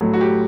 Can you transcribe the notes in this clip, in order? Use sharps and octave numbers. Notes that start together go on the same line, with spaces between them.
A2 F#3 A3
F#4
G4